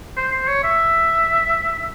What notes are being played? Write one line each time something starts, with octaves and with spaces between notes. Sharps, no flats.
C5
C5
C#5
E5